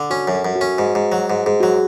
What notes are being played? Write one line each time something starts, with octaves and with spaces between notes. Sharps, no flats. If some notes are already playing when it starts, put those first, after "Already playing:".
Already playing: D3
C#4 F#4
F#2
A4
F#2
F#4
C#4
G#2
G#2
F#3
G#2
G#2 G#4
F#3 F#4